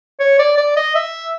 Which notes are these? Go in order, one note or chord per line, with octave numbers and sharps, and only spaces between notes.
C#5
D5
D5
D#5
E5